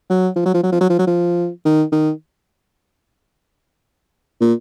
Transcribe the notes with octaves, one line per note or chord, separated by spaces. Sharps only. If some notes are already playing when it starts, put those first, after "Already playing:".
F#3
F3
F#3
F3
F#3
F3
F#3
F3
F#3
F3
D#3
D#3
A#2